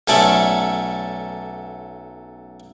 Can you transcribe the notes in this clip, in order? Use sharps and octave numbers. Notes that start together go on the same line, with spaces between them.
B1 A3 C#4 A4 D5